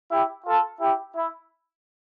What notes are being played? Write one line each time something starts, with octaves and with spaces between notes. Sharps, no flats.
E4 G4
F4 A4
E4 G4
E4